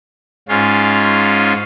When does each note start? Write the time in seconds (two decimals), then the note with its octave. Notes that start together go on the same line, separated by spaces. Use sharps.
0.49 G#2 C#4 F4